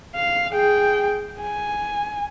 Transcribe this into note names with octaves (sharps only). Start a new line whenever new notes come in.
F5
G#4 G5
G#5